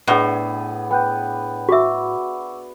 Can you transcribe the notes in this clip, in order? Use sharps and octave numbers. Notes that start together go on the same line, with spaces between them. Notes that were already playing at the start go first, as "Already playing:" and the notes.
A2 B3 D4 G#4
B3 G5 F#6 G6
F#4 E5 C#6 D6 E6